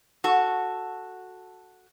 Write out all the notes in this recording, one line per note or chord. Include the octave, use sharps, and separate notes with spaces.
F#4 A4